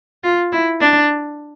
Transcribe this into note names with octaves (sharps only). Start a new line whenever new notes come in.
F4
E4
D4